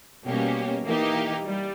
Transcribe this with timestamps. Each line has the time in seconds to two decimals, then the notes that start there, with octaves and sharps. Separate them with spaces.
0.24 B2 G3 A#3 C#4 G4
0.84 E3 A#3 D#4 G4
1.45 G3